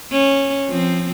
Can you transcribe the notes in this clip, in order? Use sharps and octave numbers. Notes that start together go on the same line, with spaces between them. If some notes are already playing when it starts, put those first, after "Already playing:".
C#4
F3 C4